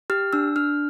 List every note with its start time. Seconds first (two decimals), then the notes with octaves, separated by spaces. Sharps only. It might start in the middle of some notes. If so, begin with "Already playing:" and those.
0.10 G4 F6
0.33 D4 E6
0.56 D4 F6